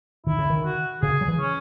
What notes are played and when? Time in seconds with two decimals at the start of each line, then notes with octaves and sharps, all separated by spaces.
0.26 D#3 E4
0.39 C#3
0.50 D#3
0.64 F#4
1.02 C#3 G#4
1.21 F#3
1.28 E3
1.40 C#4